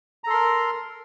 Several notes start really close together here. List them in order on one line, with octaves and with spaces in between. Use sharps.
A#5 A4 C6 A#4